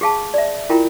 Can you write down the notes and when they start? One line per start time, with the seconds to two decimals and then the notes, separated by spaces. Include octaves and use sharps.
0.01 G4 G#4 F5 A5
0.34 D5 E5
0.69 E4 F4 A#4 G5 A#5